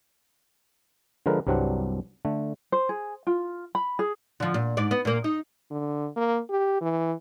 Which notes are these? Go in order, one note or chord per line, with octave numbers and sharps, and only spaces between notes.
D3 F3 G#3 A#4 B4
C2 G2 F#3 C4 D4 F#5
D3 A3
C5
G#4
F4
B5
G#4
D3 F3
A#2
G#2 D5
B3
A#2 A#3
D#4
D3
A#3
G4
E3